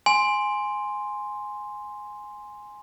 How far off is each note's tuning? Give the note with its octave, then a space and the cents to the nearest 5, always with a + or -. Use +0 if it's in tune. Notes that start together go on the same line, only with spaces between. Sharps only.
G#5 +0 C6 +0